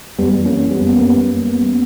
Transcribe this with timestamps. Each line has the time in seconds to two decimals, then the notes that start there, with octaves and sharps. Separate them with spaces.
0.18 F#2 G3 B3
0.39 E3
0.45 A#3 C#4
0.58 E3
0.71 G3 B3
0.77 F#2
0.91 B3
0.97 F#2 A#3